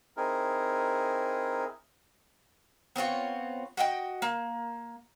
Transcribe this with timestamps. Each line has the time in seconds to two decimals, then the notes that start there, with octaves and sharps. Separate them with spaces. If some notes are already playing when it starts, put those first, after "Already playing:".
0.17 C4 D#4 E4 G#4 A#4
2.96 B3 C4 F4 C#5
3.77 F#4 D#5 F5 G5
4.22 A#3